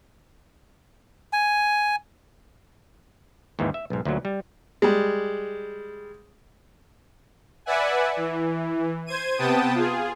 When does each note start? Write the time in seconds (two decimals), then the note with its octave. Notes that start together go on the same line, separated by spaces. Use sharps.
1.33 G#5
3.59 D#2 G#2 E3
3.74 E5
3.90 B1 G#2
4.05 D2 A#2 F#3
4.25 G3
4.82 G3 G#3
7.66 B4 D5 E5 F#5 G#5
8.17 E3
9.06 C5 G#6 D#7
9.38 C3 B3 G5 A5 D#6
9.75 F4 G#4